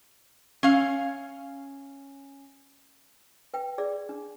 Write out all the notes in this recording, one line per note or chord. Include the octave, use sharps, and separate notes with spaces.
C#4 F5
B4 G5
G#4 D5
D4